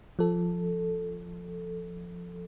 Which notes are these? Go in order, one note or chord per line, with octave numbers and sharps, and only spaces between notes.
F3 A4